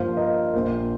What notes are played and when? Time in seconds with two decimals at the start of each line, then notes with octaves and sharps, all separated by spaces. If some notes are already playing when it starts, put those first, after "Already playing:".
Already playing: G2 F3 A#3 C5 F5
0.17 A#4 D#5
0.54 A#1 A#2 A#3 C5